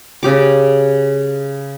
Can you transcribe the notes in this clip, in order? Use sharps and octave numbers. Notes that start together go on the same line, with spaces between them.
C#3 G4 D6